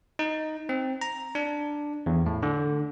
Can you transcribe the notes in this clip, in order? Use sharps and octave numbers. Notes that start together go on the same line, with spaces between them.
D#4
C4
A#5
D4
E2
A2
D3